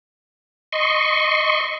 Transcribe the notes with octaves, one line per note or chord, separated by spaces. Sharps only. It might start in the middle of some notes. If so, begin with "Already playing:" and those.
D#5 C6 C#6